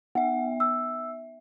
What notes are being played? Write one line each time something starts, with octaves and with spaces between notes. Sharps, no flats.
B3 E5 F#5
E6